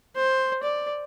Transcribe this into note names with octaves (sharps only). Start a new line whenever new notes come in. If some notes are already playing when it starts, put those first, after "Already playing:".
C5
D5